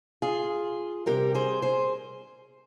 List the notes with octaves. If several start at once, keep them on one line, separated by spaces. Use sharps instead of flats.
F4 G#4
C3 G3 G4 A#4
G#4 C5
G#4 C5